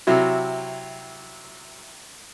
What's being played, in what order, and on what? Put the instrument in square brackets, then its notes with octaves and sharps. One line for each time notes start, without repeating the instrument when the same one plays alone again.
[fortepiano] C3 F#3 E4 F#4